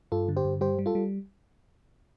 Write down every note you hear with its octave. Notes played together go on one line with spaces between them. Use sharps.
G2 F4 A4
D3
G4 C5
G2
G3 G4 C5
G3
F4 A4
G3